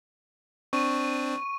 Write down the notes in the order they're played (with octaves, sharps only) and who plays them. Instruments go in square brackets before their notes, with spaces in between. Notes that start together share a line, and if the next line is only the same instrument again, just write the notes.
[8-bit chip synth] C4 D4 [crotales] C#6 D#7